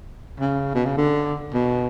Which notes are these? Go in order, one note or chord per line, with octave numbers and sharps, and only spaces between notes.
C#3
B2
C#3
D3
B2